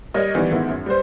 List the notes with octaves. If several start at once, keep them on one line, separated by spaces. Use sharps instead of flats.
G3 A#4 C#5 D#5
D#3 E3 G3 B3
G#2 D#3 B3 D#4 E4
F#2
G3 B4 C5